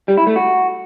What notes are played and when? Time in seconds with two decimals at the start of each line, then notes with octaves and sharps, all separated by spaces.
0.08 G3
0.17 E4
0.27 A3
0.36 F#4